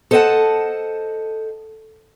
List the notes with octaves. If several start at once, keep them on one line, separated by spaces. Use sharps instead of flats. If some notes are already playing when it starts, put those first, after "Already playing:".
A4 C5 D#5 E5 F#5 A5